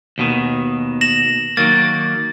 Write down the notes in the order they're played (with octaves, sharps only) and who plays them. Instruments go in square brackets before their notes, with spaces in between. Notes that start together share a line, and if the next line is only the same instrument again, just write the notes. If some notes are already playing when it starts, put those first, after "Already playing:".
[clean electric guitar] D#2 B2 D#3
[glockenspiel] A#6 E7 F#7
[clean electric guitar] D#3 F#3 A#3 [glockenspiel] A6